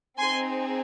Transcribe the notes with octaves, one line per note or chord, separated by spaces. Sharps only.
C4 D#4 G#4 G#5 C6